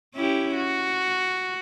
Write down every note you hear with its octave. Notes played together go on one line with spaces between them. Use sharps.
C#4 E4 G4
F#4